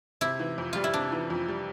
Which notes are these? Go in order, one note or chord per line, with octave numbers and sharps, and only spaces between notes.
C3 E4
E3
F2
G3 F4
E4
C3 D4
E3
F2
G3